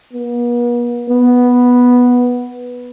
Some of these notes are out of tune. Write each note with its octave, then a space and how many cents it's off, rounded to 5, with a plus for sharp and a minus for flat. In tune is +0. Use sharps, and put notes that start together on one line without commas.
B3 -45
B3 -5